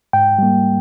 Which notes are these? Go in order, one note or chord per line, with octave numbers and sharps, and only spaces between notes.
G#2 G5
G3 A#3